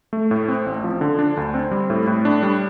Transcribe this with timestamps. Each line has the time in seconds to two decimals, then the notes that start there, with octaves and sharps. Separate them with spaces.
0.13 A3
0.31 A2
0.48 C4
0.66 A1
0.84 F3
1.01 D3
1.19 D4
1.37 D2
1.54 C4
1.71 G3
1.90 A2
2.07 A2
2.25 D4
2.43 G3